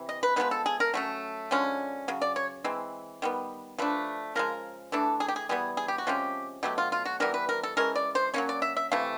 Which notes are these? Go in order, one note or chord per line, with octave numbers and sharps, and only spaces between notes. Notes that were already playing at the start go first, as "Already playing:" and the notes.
Already playing: C3 E3
D#5
B4
F3 G#3 B3 D#4 B4
A4
G#4
A#4
F#3 A3 C#4
D3 F3 G#3 C#4
C#3 F#3
D5
C#5
E3 G#3 C4
D#3 G3 B3
F3 A3 D4 B4
C#3 F3 G#3 A#4
E3 A3 D4 A4
G#4
G4
G#4
E3 G3 B3 G#4
G#4
G4
F#4
C3 F3 G#3 C#4 G4
B2 F#3 A3 G4
F4
F4
F#4
E3 G3 B3 A#4
B4
A#4
A4
E3 G#3 C#4 A#4
D5
C5
F#3 A#3 C#4 C#5
D5
E5
E5
C3 E3 A3 F5